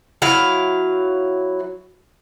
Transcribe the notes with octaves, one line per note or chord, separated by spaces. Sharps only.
F#3 E4 F5